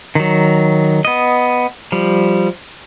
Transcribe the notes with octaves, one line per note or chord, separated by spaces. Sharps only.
D#3 F#3
B3 D#5
F3 G3